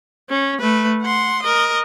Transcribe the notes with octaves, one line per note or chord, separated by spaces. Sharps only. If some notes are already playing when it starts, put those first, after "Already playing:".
C#4
A3 B4
F#5 C6
A#4 D#5